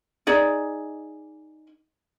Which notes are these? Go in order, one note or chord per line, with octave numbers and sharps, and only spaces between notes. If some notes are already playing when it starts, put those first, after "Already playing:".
D#4 G#4 D5